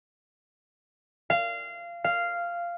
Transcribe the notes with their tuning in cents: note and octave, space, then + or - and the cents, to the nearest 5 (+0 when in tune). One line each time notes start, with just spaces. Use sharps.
F5 -20
F5 -10